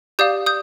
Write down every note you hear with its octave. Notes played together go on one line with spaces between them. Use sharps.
G4 D5 F5 D#6 G6
D#6 G6